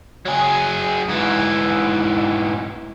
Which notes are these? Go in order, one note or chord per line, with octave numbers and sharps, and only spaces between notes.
F#3 G#4
G#2 E3